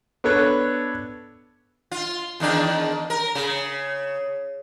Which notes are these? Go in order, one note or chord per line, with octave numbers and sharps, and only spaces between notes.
B3 D4 A4 B4 C#5
F4
E2 D#3 D4
A#4
C#3